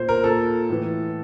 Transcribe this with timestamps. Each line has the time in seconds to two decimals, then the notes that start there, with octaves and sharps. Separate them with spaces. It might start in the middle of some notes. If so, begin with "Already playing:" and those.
Already playing: A#2 C5
0.09 A#4
0.24 A#2 A4
0.69 A2 E3